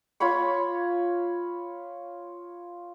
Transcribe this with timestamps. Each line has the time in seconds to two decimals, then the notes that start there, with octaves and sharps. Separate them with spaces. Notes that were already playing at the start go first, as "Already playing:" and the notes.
0.20 F4 C#5 B5 C#6